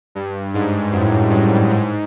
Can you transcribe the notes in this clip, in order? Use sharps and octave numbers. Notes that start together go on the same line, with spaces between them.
G2
G#2
F#2 A2
G2
G#2